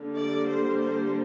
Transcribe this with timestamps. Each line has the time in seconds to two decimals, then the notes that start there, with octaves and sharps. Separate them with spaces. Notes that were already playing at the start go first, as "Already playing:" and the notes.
Already playing: D3 G3 A#3
0.17 D5
0.49 C5
0.80 C5